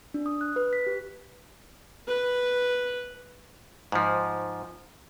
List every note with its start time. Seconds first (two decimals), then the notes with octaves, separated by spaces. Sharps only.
0.14 D4
0.26 D#6
0.41 F#6
0.56 B4
0.73 B6
0.87 G4
2.08 B4
3.92 G#2 F3